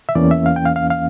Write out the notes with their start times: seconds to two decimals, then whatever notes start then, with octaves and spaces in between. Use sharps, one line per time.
0.09 E5
0.15 E2 E3 A#3 C#4 D5
0.31 E5
0.46 F5
0.56 G5
0.65 F5
0.76 F5
0.90 F5